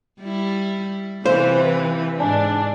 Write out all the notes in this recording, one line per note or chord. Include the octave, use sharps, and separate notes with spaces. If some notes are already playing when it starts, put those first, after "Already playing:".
G3 E4
C3 E3 B4 C5 F5 C6
G#2 D4 D5 G#5 A5